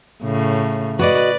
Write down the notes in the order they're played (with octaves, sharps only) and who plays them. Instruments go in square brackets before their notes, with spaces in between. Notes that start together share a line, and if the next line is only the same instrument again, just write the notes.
[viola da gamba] A2 C#3
[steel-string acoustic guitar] F#4 D#5 [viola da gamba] B4 D5